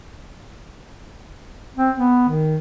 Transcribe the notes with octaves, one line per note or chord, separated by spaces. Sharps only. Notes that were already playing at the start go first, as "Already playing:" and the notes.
C4
B3
D#3